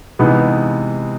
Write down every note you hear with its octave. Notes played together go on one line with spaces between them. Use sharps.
C3 E3 G#3 B3 D#4